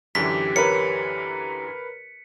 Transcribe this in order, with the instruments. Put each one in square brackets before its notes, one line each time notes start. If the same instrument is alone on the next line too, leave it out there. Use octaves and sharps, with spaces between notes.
[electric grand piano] F#2 D3 E3 [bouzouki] G4 [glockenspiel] B6
[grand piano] A#4 B4 C#5 [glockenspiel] C#7